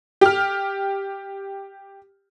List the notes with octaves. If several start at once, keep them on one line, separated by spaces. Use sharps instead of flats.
G4 F6